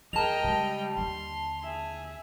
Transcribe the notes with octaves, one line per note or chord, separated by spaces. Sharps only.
D#2 G#4 A#4 D#5 G5 A5 F7
C#3 G3 G#3
D#2 D3 C6
G#4 E5